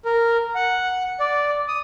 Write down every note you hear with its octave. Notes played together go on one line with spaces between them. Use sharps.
A#4
F#5
D5
D#6